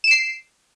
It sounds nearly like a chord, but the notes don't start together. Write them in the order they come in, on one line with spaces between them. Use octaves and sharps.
E7 D7 C7